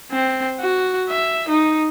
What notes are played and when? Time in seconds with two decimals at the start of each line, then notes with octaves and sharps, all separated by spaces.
0.11 C4
0.59 F#4
1.09 E5
1.48 D#4